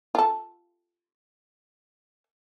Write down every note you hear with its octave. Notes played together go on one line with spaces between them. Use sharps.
F4 A4